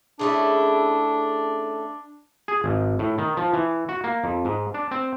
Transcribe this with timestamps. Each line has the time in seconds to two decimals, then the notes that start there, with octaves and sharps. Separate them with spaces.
0.19 C#3 A3 D4 E4
2.48 G#4
2.64 G#1
2.99 A2
3.18 D#3
3.37 F3
3.53 E3
3.89 F#4
4.04 A#3
4.24 F2
4.45 G#2
4.74 D4
4.91 C4